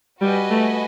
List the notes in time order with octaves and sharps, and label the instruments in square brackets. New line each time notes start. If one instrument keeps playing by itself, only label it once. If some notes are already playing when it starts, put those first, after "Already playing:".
[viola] G3 [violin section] F#4 B4 D#5 G#5
[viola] A3